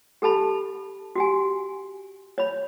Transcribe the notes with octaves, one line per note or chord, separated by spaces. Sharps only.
G4 A4 A5 B5
F#4 G4 G#5
C#5 B5